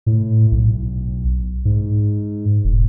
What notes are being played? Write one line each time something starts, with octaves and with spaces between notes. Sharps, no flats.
A2
B1
G#2
E1